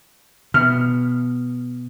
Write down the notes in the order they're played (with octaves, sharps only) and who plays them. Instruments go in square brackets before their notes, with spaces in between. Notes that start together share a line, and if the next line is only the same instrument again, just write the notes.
[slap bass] B2 [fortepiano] F6